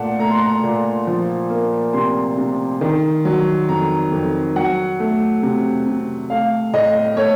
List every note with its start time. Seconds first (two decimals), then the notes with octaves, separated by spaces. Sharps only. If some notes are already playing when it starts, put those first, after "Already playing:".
Already playing: A#2 A3 F#5 A5
0.19 A3 A#5
0.31 C6
0.40 A#5
0.64 A#2
1.07 F3
1.50 A#3
1.93 C3 C6
2.38 C3
2.81 D#3
3.25 F#3
3.69 F2 A#5
4.12 F2
4.56 F#3 F#5
5.00 A3
5.43 C3
5.86 C3
6.30 A3 F5
6.74 A2 D#5
7.17 A3 C#5